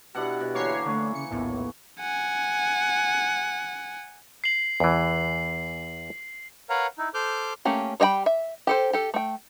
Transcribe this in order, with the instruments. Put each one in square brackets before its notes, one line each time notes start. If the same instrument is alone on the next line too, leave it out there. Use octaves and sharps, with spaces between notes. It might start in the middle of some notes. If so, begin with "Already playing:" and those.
[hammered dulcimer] B2 D4 E4 [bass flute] G4 [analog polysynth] F#5
[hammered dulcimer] B2
[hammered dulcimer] D3 E3 A#3 [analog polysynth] C#5 C7
[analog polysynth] D3 [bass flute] A3 [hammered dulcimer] C#5
[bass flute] C#3 [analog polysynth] C#7
[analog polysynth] A#1 D#2 A2 [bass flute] B3
[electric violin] F#5 G#5
[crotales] C7 F#7
[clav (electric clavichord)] E2 E3
[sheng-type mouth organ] A#4 B4 C#5 F5 F#5 A#5
D#4 E4
A4 C5 D6 F6 G6
[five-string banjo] A3 A#3 C#4 G4
G3 C#5 D#5 G5 B5
E5
G4 A4 C5
G4 A4
A3 G5